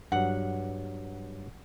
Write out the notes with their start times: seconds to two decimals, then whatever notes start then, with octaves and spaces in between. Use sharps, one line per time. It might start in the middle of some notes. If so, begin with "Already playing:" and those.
0.12 G2 F#3 F#5